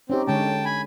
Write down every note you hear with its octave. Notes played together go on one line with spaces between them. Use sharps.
C4 C#4 D#4 G4
D3 G#3 C#4 G5 A5
G#5 B5